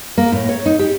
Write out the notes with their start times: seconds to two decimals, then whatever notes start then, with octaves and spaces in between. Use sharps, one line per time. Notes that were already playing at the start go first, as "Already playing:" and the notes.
0.18 A#3
0.32 A2
0.49 C#5
0.66 D#4
0.79 G4